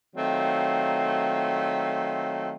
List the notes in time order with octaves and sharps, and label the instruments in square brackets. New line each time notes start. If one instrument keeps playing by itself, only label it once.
[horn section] D#3 F#3 A3 C4 F4